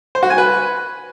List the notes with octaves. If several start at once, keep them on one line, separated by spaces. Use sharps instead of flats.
C5
F#4
G#5
B4